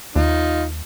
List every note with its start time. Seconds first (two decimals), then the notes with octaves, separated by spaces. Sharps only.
0.16 D#2 D#4 F4